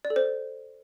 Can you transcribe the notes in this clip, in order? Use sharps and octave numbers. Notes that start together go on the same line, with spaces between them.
D5
A4
C5